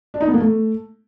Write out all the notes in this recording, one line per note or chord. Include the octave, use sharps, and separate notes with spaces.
D4
D#4
B3
A#3
A3